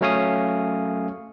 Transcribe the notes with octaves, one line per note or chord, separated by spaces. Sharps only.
F#3 A3 C#4 C#5 F5 D#6